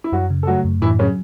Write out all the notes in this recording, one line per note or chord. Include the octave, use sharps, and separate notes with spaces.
E4
F#2 F#3 F#4
C#3
A4
F#3 A3 F#4
F#2
A2 E3 E4
C#3 F#3 C#4